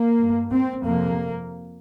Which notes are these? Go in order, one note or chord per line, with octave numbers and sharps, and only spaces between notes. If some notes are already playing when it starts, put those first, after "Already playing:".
Already playing: A#3
G2
C4
F2 C3 A#3